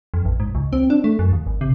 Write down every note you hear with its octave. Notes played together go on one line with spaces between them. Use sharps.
F2
A1
G#2
C#2
C4
D4
A3
F#2
D#2
G#1
C3